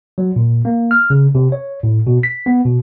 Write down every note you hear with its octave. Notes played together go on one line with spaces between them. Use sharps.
F#3
A#2
A#3
F6
C#3
C3
C#5
A2
B2
B6
B3
B2